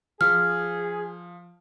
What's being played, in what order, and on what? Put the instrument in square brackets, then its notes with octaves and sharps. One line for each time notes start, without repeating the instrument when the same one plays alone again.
[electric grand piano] F3 [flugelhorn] G#4 [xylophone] F6